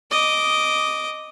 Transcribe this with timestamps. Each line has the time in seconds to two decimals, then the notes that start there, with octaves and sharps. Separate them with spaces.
0.11 D#5 D6